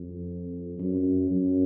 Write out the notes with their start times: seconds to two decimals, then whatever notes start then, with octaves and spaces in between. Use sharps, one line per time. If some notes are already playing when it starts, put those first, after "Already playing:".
Already playing: F2
0.79 F#2
1.31 F#2